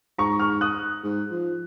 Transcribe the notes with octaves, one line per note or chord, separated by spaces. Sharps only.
G#2 A#5 C#6
C#6 F6
D#6 F#6
G#2
F3